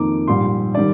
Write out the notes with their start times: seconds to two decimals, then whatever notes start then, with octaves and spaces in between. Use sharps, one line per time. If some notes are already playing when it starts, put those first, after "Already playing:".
Already playing: F2 D#3 A#3 D#4 D6
0.27 A#1 G#2 G3 C6
0.74 D#3 G3 D5